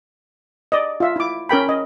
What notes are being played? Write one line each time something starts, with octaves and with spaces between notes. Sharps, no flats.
D5 D#5
F4 E5
E4 D6
C#4 A#4 G5 B5
D#5